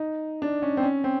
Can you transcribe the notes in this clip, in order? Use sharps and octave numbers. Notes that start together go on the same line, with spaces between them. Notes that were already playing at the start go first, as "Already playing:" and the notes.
Already playing: D#4
D4
C#4
C4
C#4
C4